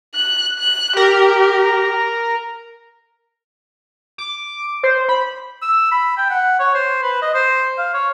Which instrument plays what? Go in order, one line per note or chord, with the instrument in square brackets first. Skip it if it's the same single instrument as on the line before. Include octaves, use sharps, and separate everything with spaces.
[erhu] F#6
F#6
[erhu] G4 [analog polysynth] A#4
[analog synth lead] D6
C5
B5
[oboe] E6
B5
G5
F#5
C#5
C5
B4
D#5
C5
F5
C#5